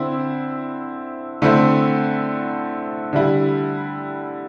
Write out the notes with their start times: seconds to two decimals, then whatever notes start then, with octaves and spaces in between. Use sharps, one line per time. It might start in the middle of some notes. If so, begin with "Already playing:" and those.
Already playing: D3 C4 E4
1.42 D3 A3 C4 E4
3.13 D3 G3 E4